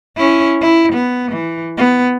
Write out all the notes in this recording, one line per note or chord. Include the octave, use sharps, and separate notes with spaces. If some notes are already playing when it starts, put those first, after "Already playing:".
C#4 E4
E4
B3
E3
B3